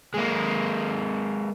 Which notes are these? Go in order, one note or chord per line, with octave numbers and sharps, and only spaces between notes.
G#3 A#3